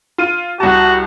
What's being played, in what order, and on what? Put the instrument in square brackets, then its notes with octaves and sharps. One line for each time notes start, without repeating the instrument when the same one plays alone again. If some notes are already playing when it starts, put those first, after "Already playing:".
[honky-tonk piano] F4 D#7
[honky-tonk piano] C2 A5 [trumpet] F#4